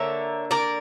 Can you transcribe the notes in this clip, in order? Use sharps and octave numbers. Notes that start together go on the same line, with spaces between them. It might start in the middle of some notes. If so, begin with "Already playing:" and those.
Already playing: D3 A#3 C#5 E5
A#4 D5